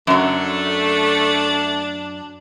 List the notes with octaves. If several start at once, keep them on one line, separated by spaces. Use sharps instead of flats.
F#2 F#3 A3 D4